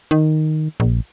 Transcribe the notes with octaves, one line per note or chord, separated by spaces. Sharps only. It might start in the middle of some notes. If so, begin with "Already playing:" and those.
D#3
A#1